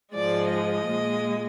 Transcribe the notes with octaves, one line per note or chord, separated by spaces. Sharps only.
G#2 F3 G#3 D5
D#5
A#2 G#3